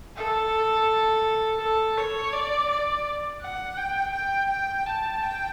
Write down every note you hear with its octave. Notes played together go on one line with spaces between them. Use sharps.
A4
A4
C#5
D5
D5
F#5
G5
G5
G5
A5
G5